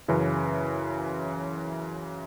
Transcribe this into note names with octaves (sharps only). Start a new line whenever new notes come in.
F#2 C#3 E3